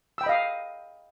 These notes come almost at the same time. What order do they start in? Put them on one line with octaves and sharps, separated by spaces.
E6 G5 B5 D#5 F5